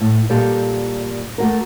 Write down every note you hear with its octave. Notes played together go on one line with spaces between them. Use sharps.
A2
A#2 G3 G4 A4
A3 F#4 A#4